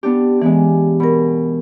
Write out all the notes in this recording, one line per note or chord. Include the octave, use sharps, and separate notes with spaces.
B3 D4 G4
E3 G#3 B3 G4
B2 A#4 B5